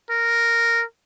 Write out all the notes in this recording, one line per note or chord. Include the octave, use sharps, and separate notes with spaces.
A#4